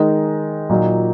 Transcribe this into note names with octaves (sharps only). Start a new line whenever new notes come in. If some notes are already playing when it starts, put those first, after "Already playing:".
Already playing: D#3 G#3 D#4
A#2 F#3 A#3 D#4